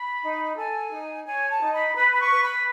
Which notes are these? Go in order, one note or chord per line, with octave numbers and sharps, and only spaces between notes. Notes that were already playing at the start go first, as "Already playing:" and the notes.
Already playing: B5
D#4
A4 G#5
D#4
C#5 G#5
A5
D#4
B5
B4 B5
B5
C#6
B4
B5